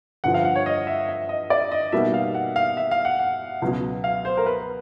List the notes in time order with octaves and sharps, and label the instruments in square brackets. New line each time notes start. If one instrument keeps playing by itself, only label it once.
[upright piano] G2 D3 F3 [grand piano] F#5
[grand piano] F5
F#5
C#5
D#5
E5
E5
D#5
D5
D#5
[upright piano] B2 G3 A#3 D#4 F#4 [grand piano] E5
[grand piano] F5
F#5
F5
E5
F5
F#5
F#5
[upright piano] C#2 B2 F#3
[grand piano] F5
C5
A#4
B4